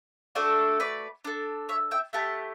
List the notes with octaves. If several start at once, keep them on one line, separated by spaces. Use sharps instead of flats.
A3 D4 F#4 A4
B4 D5
D4 A4
C#5 E5
E5 G5
A3 E4 G4 F#5 A5